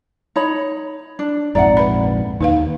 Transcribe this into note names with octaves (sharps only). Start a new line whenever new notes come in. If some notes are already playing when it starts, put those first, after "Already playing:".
D#4 C#5 B5
D4
A#1 F2 G#2 D5 E5 F#5 A#5
B4 B5
D#2 D#4 B4 F5